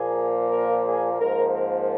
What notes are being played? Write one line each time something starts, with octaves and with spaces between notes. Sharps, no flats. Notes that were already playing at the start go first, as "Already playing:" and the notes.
Already playing: A#2 F3 A#3 G#4
A#4
G#4
G#2 F3 A#3 A#4
A#4